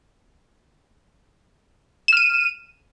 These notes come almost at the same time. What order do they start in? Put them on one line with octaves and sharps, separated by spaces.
E7 F6 D#7